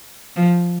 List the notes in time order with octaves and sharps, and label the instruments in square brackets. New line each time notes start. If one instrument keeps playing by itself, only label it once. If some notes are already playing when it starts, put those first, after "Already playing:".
[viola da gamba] F3